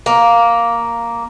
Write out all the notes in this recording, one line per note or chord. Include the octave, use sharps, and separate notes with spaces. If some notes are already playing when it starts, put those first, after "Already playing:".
A#3